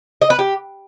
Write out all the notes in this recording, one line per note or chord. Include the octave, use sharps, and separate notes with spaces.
D#5
B4
G4